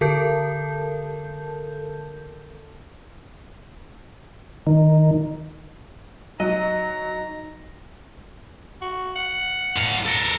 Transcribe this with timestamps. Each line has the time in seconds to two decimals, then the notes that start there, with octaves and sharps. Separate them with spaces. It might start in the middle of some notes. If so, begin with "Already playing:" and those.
0.01 D3 A4 A#4 A5 G6
4.67 D#3
6.40 F#3 D#4 D#5 A#5
8.81 F#4
9.16 F#5
9.76 A2 F5
10.05 A4 A#4